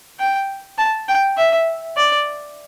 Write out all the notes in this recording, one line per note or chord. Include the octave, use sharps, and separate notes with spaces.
G5
A5
G5
E5
D5